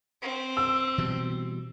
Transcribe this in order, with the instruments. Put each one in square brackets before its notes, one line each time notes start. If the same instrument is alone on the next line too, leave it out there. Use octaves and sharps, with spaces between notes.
[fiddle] C4
[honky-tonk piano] E6
[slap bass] B2 E3 G3